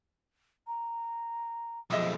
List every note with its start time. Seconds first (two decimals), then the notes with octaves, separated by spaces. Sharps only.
0.67 A#5
1.90 B1 F2 G#4 D#5 E5 D#6